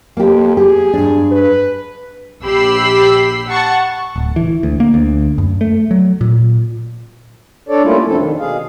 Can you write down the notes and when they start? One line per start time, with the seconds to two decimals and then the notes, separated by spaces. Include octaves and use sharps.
0.17 F2 A#3 G4
0.57 G4 G#4
0.93 G2 D4
1.31 B4
2.42 A#1 G4 B5 E6 C7
3.51 F#5 A5 C#6
4.16 D1
4.36 E3
4.63 D2
4.80 A#3
4.94 D2
5.38 F#2
5.61 A3
5.91 F#3
6.21 A#2
7.69 D4 A4 C#5 D5
7.83 G3 A3 A#3 C#4 E4 F4
8.06 F2 B2 F3 C4 D4 A4
8.18 D#3
8.39 B2 G#4 F5